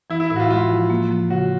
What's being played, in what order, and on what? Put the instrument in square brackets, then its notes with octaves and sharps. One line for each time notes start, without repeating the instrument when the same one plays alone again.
[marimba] E3 [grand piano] E4
[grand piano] E4
[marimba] A2 [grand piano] E4
[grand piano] F#4
F4
[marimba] G#3 [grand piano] F4
[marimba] F3
A#3
F3
[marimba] C#3 [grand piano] F#4